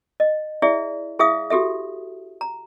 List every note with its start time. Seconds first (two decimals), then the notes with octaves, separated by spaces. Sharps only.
0.20 D#5
0.62 E4 G#4 D5 E5
1.19 E4 G#4 E5 F5 D#6
1.50 F#4 G4 A4 E5
2.41 A#5